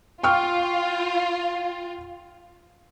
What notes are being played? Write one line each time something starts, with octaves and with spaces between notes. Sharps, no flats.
F4 G5 C#6 F6